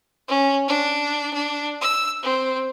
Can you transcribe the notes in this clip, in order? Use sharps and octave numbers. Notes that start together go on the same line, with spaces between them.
C#4
D4
D4
E6
C4